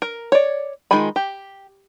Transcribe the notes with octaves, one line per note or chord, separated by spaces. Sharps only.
A#4
C#5 D5
D#3 G#3 F4 G#5 B5
G4